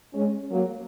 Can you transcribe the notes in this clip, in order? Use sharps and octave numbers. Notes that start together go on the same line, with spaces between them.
G#3 C#4
F#3 A#3